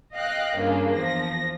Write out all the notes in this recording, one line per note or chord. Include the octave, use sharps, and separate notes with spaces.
D#5 F5 G5 F#6 A#6
G2 C#3 A#3 D4 F4
E2 F3 A#6